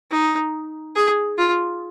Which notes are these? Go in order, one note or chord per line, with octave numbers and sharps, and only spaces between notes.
D#4
G#4
F4